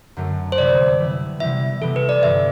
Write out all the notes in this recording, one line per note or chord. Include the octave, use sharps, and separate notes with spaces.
F#2 D3 F#3 A3 C4
C5
C3 E3 G3 B3 E4 D5
C3 E3 G3 B3 E4
C3 E3 G3 B3 E4 E5
C3 E3 G3 B3 E4 A4
B4
D5
G1 G2 E3 E5